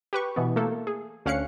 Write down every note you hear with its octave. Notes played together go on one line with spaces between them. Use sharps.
G4 B4 C#6
B2 E3 B3
A3 A#3 A4
G#4
D2 C#4 F5 F#6 C#7